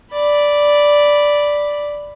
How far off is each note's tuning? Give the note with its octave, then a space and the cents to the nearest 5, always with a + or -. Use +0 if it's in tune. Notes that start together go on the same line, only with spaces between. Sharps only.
D5 -5 B5 +0